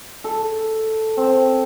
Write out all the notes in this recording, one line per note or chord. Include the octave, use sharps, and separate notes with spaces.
A4
C4